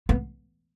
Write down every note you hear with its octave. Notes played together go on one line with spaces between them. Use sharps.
B3